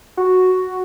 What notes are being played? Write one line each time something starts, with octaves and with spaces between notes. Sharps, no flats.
F#4